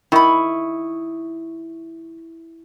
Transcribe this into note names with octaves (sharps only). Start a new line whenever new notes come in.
D#3 E4 B5 C#6 D#6